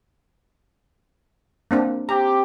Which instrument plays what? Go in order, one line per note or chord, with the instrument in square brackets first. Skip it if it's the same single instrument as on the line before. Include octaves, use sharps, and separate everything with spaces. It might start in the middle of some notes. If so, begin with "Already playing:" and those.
[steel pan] A#3 C4 D4
[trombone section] C4 G4 [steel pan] A#5